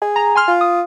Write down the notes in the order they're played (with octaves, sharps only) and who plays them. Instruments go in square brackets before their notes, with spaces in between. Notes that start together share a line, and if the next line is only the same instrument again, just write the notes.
[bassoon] G#4
[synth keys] A#5
G#5 C6 F6
[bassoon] F4
[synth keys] D#6